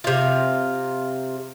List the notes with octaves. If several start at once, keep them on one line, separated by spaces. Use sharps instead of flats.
C3 F4